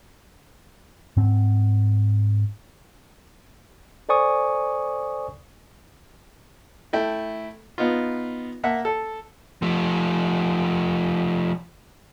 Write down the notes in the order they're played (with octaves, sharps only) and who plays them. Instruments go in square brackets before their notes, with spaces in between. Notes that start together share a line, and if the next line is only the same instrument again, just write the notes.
[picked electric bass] G#2 C4
[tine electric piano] A4 C5 D5 G#5 C#6 D#6
[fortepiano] A3 E4 G5
B3 D#4 F4
A#3 E5 F#5
A4
[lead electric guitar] F3 A3